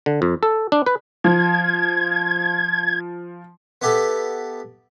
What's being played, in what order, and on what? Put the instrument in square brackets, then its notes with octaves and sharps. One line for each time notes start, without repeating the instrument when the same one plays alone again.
[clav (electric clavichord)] D3
F2
A4
D4
B4
[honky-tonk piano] F3 [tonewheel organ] G#6
[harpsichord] B3 E4 G4 A4